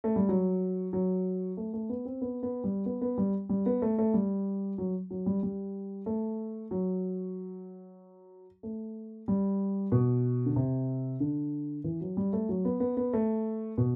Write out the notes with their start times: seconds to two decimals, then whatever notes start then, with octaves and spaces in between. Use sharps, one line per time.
0.04 A3
0.16 G3
0.29 F#3
0.93 F#3
1.57 A3
1.73 A3
1.89 B3
2.05 C4
2.21 B3
2.43 B3
2.64 G3
2.86 B3
3.01 B3
3.18 G3
3.49 G3
3.66 B3
3.82 A3
3.98 A3
4.14 G3
4.78 F#3
5.11 F#3
5.26 G3
5.43 G3
6.06 A3
6.71 F#3
8.63 A3
9.28 G3
9.92 B2
10.46 D3
10.56 C3
11.20 D3
11.84 E3
12.01 F#3
12.17 G3
12.33 A3
12.49 F#3
12.65 B3
12.80 B3
12.97 B3
13.13 A3
13.78 B2